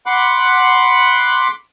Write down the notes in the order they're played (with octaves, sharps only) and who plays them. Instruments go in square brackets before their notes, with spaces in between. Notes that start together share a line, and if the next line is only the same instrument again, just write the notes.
[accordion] F#5 B5 C6 D6 F#6